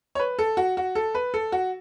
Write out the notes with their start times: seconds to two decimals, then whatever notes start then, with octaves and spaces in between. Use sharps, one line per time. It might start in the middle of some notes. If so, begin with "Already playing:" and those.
0.15 C#5
0.19 B4
0.39 A4
0.57 F#4
0.77 F#4
0.95 A4
1.15 B4
1.34 A4
1.52 F#4